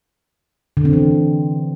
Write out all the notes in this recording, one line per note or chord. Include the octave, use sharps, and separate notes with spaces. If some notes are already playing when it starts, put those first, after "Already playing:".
D3
C4
E3